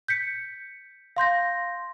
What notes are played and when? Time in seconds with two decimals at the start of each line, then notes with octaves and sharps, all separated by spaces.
0.08 G6 B6 C#7
1.16 F5 C6 G6 A#6